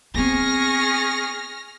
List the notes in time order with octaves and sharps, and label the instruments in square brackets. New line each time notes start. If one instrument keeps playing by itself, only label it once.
[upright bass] B3 C4 [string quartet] G#4 C#6 [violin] F6 A#6